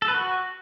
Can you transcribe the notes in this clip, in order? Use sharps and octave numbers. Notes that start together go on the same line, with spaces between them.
A4
B4
F#4